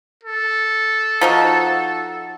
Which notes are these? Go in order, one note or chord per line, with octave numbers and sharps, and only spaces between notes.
A4
F3 D#4 F#4